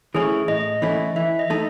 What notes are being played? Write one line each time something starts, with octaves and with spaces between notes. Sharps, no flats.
E3 A3 C#4 E4 G#4
A2 D#5
E3 A3 C#4 E4
E3 E5
D#5
A3 D#4 A4